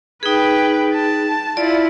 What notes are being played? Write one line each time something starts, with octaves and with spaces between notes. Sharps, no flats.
D#4 G#4 B4 G5
A5
E4 F4 D5